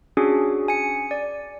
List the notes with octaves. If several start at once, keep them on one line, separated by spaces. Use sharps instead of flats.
C#4 D4 F#4 G#4
G#5 C#7
D5